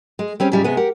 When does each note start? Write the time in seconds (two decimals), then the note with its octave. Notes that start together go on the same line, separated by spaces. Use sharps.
0.19 G#3
0.40 G3 C4 C#4
0.52 G#2 C#3 G3 E4 F4
0.64 C3 G#3 B3
0.77 G4 A#4 F#5